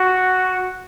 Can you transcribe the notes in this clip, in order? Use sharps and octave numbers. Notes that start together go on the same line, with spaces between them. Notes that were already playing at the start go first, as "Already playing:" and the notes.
Already playing: F#4